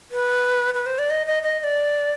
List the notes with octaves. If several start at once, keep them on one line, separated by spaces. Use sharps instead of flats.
B4
B4
C5
D5
D#5
D#5
D#5
D#5
D5